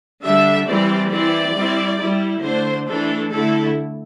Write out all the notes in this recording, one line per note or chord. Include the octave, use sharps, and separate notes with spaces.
D3 G3 D4 E5
E3 G3 C4 D5
E3 C4 E4 D5
G3 C4 E4
G3 E4
D3 A3 D4 C5
E3 A3 D4 A4
D3 A3 E4 A4